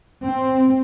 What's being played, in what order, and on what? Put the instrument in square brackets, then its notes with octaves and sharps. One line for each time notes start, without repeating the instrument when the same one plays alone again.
[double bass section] C4